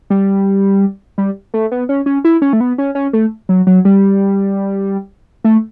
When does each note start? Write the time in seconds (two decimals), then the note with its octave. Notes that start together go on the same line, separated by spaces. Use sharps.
0.10 G3
1.18 G3
1.54 A3
1.72 B3
1.89 C#4
2.06 C#4
2.25 E4
2.42 C#4
2.53 A3
2.61 B3
2.78 C#4
2.95 C#4
3.13 A3
3.49 F#3
3.67 F#3
3.85 G3
5.45 A3